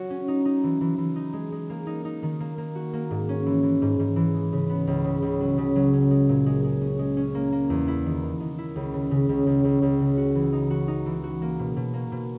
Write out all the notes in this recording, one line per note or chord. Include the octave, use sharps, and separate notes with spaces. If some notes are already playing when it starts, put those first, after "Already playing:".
Already playing: F#3 F#4
C#4
D#4
D#4
E3
E3
E3
D#4
G#3
G#3
A#3
D#4
D#4
D#3
A#3
A#3
F#4
A#3
G#2
C#4
E3
E3
G#2
G#2
E3
G#3
C#3
B3
C#2
C#3
C#2
F#3
C#3
F#3
C#4
G#3
A#2
G#3
G#3
C#4
G#3
C#4
A#3
A#3
E2
E4
D#3
D#3
D#3
E4
C#2
C#3
C#3
C#2
C#2
C#2
C#2
C#3
F#4
E3
D#4
F#4
D#4
E3
F#4
A#3
B2
B2
A#3
B2